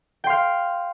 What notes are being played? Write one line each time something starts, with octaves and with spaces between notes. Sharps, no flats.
F5 G5 C6